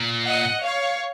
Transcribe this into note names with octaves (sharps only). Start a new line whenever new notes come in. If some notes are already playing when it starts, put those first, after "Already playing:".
Already playing: A#2
D#5 F#5
C#5 F5